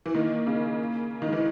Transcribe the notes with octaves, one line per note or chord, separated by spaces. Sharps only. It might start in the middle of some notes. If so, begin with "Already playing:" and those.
E3
D#3 A#3
C#3
A#3
D#3
E3 G#3